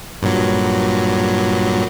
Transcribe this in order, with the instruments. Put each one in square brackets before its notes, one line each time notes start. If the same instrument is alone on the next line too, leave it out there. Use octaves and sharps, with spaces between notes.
[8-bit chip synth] G2 A#2 F#3